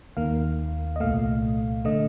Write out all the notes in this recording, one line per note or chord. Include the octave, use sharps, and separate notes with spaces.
D#2 D#3 A#3 F5
D#5
C2 A#2 A3 F5
D3 A3 D#5